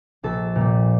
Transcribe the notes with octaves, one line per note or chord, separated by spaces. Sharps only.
A#1 A4
A#2 G3